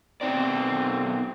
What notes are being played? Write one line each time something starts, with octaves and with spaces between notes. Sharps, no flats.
B2 C4 D#4 D5